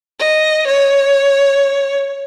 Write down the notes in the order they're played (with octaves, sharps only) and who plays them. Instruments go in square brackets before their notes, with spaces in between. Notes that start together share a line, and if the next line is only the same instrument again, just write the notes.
[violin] D#5
C#5